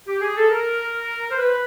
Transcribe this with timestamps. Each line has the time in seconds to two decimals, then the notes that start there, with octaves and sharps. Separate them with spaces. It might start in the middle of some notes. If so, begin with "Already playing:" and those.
0.07 G4
0.20 G#4
0.35 A4
0.49 A#4
1.30 C5
1.37 B4